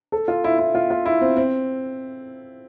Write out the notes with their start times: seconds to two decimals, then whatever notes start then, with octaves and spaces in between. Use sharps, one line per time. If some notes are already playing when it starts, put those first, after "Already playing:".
0.12 A4
0.28 F4
0.44 E4
0.59 E4
0.75 F4
0.90 F4
1.06 E4
1.21 C4
1.37 C4